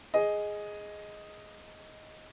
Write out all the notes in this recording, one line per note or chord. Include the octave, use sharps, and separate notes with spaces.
G#4 D#5